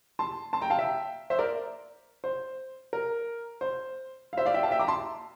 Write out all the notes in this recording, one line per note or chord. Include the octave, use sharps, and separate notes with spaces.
A5 C6
A5 C6
G5 A#5
F5 A5
E5 G5
C5 E5
A#4 D5
C5
A#4
C5
F5
C5 E5
D5 F5
E5 G5
F5 A5
E5 G5
A#5 D6
A5 C6